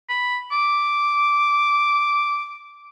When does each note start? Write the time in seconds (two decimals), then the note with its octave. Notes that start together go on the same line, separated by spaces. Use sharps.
0.09 B5
0.52 D6